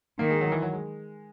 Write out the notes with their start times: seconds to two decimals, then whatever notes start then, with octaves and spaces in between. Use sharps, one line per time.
0.19 D#3 A#3
0.31 G#3
0.41 F#3
0.52 E3
0.62 F#3
0.73 G#3